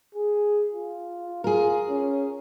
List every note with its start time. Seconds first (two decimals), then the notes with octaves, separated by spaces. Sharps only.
0.15 G#4
0.73 F4
1.44 F4 G#4 A#4
1.89 C#4